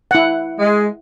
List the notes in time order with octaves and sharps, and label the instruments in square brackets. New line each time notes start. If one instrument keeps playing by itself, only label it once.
[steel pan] E4 F#5
[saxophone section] G#3